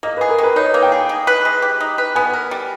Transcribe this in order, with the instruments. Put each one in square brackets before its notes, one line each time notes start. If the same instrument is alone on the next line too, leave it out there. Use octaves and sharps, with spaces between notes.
[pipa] A#3 [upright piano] D#5
[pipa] G#4 [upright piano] B4
[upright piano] A#4
[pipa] D#3 [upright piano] B4
[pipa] D#4 [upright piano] C#5
[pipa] A#3
[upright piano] G5
[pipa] G#4
D#4
B4
G#3
G4
D#4
B4
[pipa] B3 [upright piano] G#5
[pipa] A#4
G3